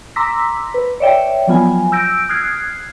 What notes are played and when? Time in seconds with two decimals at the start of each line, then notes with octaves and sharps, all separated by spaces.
0.16 A#5 C6 D6 E6 A#6 B6
0.74 B4
1.00 C#5 D5 E5 G5
1.47 F3 F#3 B3 F4 G#5
1.92 E6 G6 A#6 D7
2.29 D#6 F6 F#6 G#6 C7